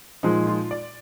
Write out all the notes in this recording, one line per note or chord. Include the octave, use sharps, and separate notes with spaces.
A#2 F3 G#3 D#4
F4
D5